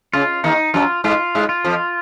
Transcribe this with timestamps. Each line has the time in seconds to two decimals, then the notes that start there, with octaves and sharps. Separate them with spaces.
0.13 C#3 F4
0.44 D#2 D#3 D#4
0.74 F#2 F#3 F4
1.04 G#2 G#3 F4
1.35 G#2 G#3
1.49 F4
1.64 F2 F3